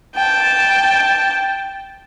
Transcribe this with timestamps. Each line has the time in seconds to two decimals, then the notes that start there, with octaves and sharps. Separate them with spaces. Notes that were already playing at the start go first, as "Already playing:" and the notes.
0.15 G5 A5